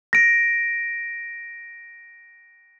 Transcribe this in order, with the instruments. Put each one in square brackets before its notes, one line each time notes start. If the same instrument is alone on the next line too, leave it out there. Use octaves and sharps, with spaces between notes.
[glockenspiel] A#6 D7